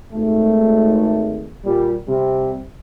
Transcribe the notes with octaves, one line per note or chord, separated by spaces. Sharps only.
G#1 A3
A#2 G3
C3 G3